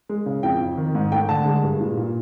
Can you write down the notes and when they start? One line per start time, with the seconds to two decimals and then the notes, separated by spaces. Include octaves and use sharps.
0.09 G#3
0.26 C#3
0.43 F2 G5
0.61 F2
0.78 D#3
0.95 G#2
1.12 A3 G5
1.29 D3 A5
1.46 G#3
1.63 G2
1.80 A#2
1.97 A#2